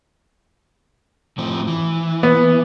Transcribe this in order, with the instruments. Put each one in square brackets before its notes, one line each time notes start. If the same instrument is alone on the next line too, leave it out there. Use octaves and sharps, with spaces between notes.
[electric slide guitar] A2 F3 C4
E3
[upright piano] B3